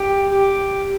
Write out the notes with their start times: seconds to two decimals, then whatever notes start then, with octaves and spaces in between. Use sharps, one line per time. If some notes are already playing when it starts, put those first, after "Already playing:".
Already playing: G4
0.31 G4